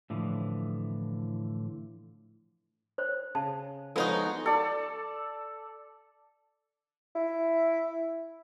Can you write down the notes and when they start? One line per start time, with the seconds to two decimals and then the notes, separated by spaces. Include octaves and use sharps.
0.10 A2 D3 E3 F3
2.98 C5 C#5
3.35 C#3 A5
3.96 F3 G#3 B3 D#4 F#4 A4 C#5
4.46 A4 D5
7.15 E4